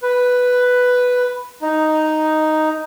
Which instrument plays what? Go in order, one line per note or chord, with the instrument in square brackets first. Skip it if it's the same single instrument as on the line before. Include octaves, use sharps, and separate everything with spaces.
[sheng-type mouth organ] B4
D#4